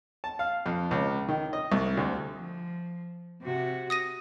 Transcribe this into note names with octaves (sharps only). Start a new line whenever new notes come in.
A5
F5
F2
C#2
D#3
D#5
C2
D2
F3
C3 F#4
D#6 A#6 D#7